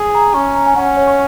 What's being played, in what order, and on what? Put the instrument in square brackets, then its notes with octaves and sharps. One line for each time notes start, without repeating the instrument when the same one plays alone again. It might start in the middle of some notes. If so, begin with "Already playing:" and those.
Already playing: [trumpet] G#4
[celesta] A#5
[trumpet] C#4 [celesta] C#6
[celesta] A#5
G#5
[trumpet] C#4 [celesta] F#5
[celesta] C#5
C#6